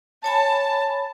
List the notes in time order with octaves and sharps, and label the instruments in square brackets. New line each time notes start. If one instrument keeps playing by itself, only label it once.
[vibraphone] C#5 G#5 B5 [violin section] A5